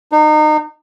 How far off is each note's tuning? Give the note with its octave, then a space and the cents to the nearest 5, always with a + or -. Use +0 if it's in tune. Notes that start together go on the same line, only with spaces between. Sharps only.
D#4 -30